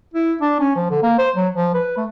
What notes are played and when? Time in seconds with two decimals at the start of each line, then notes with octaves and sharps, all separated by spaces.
0.14 E4
0.41 D4
0.60 C#4
0.76 F3
0.91 D3
1.03 A#3
1.18 C5
1.36 F#3
1.54 F3
1.75 B4
1.97 A3